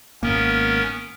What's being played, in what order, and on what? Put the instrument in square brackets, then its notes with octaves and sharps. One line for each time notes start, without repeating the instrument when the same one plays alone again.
[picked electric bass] G#1 A#3 [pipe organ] B3 C#4 A#4